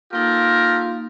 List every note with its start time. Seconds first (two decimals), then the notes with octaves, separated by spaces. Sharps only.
0.13 A#3 D#4 F4 G4 A4 A#4